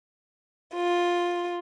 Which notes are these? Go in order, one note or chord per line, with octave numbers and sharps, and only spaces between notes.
F4